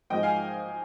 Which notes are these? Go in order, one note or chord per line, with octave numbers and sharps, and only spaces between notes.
G#2 F3 G#3 D#5 G5
F5 G#5